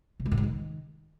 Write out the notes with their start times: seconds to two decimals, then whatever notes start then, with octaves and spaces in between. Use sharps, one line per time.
0.20 C3
0.26 G#3
0.32 A2
0.37 G#2
0.43 D#3